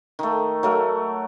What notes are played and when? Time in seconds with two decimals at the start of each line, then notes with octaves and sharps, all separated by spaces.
0.19 D#3 A3
0.63 F#3 A3 A#4